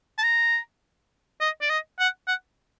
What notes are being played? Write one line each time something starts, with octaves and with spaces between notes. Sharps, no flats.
A5
A#5
D#5
D5
D#5
F#5
F#5